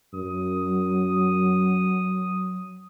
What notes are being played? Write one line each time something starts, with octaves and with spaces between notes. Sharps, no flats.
F#2 F#3 D#6